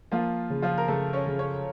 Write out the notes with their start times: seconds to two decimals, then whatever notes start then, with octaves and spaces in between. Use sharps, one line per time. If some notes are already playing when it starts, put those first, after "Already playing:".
0.12 F3 A#3 F4
0.50 C#3
0.62 F3 F4
0.78 A#4
0.88 C#3 A3 A4
1.13 C#4 C#5
1.27 C#3
1.39 C#4 C#5